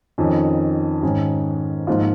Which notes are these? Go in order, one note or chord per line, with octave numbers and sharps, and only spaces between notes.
F2 D#3 C#4
G#2 D#3 C#4
G#2 F3 A#3 F4